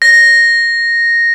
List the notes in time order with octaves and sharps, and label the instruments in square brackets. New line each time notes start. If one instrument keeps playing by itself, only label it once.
[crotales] A#6